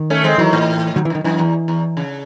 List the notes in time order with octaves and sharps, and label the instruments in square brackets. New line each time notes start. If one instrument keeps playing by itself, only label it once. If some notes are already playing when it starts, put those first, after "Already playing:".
Already playing: [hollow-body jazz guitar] D#3
[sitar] A3 C#4
G#3 C4
[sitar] D#3 F#3 [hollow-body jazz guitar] E3
[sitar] A2
[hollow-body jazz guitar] D#3 F#3
E3
[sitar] F#2 [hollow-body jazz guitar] D#3
[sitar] F#2 [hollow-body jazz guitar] E3
[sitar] E2
E2
C#3